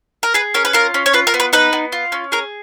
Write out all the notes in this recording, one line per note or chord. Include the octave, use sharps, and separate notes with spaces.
A#4
G#4 B4
C#4 A#4
B4
F4 A#4
C#4
C#5
F4 B4
A#4
B3
B4
D#4 B4
B3
F4
C#4
G#4 A#4